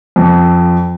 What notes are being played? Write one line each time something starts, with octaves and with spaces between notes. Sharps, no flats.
F2